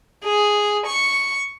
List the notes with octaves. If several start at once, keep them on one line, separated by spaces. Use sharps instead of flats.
G#4
C#6